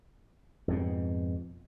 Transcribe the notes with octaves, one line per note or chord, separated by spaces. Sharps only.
F2 G#2 B2